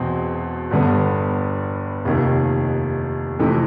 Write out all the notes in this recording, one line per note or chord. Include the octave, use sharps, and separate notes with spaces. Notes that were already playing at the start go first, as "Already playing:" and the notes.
Already playing: E1 E2 B2 C4
G1 G2 D3 G3 B3
F1 D#2 D#3
F2 C3 E3 A3